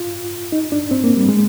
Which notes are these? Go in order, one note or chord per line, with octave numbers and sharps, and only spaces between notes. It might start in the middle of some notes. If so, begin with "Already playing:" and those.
Already playing: F4
D#4
D4
C4
A#3
G3
G#3